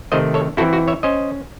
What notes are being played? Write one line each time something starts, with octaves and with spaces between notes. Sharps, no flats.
C3 D#3 A3 C5 D#5
A4 C#5
E3 C4 E4 F#4 A4
F#4
C#5 E5
C#4 C5 D#5